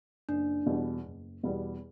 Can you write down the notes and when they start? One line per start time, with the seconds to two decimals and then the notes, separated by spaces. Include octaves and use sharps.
0.29 F#1 D4
0.66 E2 B2 G3 B3
1.06 F#1
1.43 E2 B2 G3 B3